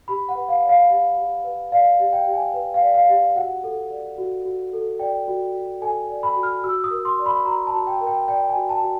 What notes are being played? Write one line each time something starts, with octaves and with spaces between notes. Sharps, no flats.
G4 B5
F#5
B4
F5
D5
F5
G4 F5
G4
B4
D5 F5
G4
G5
G4
G#5
B4
F5
D5
F5
G4
F#4 F#5
A4
D5
F#4
F#4
A4
D5 G5
F#4
F#4
A4 G#5
D5
B5
F#4
F6
F#4 E6
D#6
A#4
C6
D5
B5
F#4 A#5
A5
F#4
G5
A#4
G5
D5 G5
G#5
F#4
A5
F#4